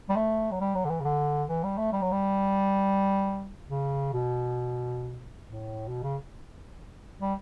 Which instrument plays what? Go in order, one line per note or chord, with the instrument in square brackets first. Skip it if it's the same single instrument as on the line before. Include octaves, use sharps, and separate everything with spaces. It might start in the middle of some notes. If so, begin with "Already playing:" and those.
[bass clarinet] G3
A3
F#3
G3
F#3
D3
E3
C#3
D3
E3
G3
A3
G3
F#3
G3
C#3
B2
A2
B2
C#3
G3